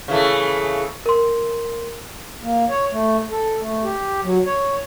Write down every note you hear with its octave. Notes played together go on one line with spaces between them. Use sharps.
C#3 E3 A3
A#4 C6
A#3
C#5
A3
A4
A3
G4
F#3
C#5